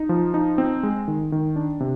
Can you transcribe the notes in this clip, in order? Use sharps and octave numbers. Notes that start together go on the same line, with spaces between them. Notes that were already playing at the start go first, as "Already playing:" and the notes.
Already playing: D#4
F3
D#4
C4
G#3
D#3
D#3
D4
C3